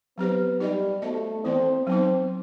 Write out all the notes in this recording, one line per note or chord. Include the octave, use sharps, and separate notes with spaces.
F#3 B3 C4 D#4 G4 C5
G3 D#4 G4 B4 D#5
A3 B3 F#4 C5 D#5
E3 B3 C4 E4
F#3 B3 C4 D#4